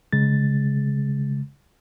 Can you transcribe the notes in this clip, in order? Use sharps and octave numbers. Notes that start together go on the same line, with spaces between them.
C#3 G#3 A6